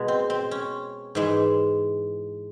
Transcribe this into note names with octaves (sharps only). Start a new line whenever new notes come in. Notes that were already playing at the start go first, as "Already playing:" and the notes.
Already playing: B2 G#3
C4
C4
C#4
G#2 E3 G#3